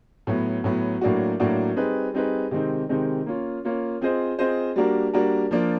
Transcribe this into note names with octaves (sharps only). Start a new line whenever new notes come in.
A2 F#3 B3
A2 F#3 B3
A2 F#3 A#3 D4 F#4
A2 F#3 A#3 D4 F#4
G3 C4 D#4 G#4 B4
G3 C4 D#4 G#4 B4
C3 D#3 G#3 C4 D#4
C3 D#3 G#3 C4 D#4
A#3 C#4 F4
A#3 C#4 F4
C4 F4 G#4 C5 D#5
C4 F4 G#4 C5 D#5
G3 A#3 D4 F#4 A#4
G3 A#3 D4 F#4 A#4
F3 A#3 D4 F4